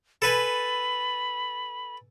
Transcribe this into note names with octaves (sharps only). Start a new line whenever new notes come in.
A4 B4 G#5 B5